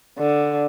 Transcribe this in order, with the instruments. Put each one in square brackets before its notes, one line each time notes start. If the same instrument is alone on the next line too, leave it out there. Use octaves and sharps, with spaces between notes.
[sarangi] D3